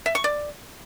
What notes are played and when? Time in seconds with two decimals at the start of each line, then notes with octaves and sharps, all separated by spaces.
0.06 E5
0.15 C#6
0.24 D5